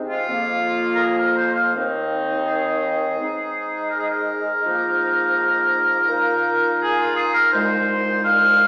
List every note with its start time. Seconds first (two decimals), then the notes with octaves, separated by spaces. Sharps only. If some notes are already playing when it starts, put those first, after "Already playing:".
Already playing: C3 G#3 C4 D#4
0.10 F4
0.28 F2 F3 A#3
0.93 A#4
1.00 G#4
1.19 A#4
1.37 C5
1.55 F5
1.73 D#2 D#3 C4 D#4
2.46 G#4
3.18 G#2 G#3 D#4
3.91 A#4
4.00 G#4
4.09 A#4
4.63 G#2 F3 A#3 D#4
6.08 A#2 A#3 D#4
6.80 G#4
6.98 F4
7.17 G#4
7.35 A#4
7.53 C2 A#2 G#3 D#4 C5
8.25 F5